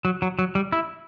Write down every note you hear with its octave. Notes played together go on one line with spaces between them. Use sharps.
F#3
F#3
F#3
G3
E4